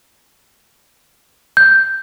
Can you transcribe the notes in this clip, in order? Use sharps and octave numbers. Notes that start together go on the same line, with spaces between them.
G6